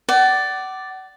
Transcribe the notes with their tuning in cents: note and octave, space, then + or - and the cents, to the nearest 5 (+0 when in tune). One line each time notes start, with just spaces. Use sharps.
D5 +0 F#5 +35